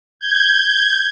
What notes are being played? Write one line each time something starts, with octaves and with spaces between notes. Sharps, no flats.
G6 G#6